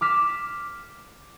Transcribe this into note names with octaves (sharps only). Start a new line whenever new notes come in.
D6 F6 B6 E7